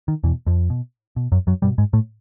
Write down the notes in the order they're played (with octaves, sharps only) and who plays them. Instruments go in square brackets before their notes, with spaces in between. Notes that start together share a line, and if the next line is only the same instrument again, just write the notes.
[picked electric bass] D#3
E2 B2 E3
F2 F3
B2
B2
F#2 F#3
F#2 F#3
G2 B2 G3
G#2 G#3
A2 A3